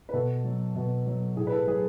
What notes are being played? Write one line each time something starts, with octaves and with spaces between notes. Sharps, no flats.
B4
B2 A4
F#3
B2
F#3
A2 G#4
B4
A4
F#3 G#4